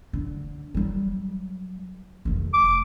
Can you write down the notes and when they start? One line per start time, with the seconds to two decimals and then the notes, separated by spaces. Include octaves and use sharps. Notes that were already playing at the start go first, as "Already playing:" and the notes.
0.13 D3
0.75 F#3 G3
2.25 F1 D#3
2.54 D6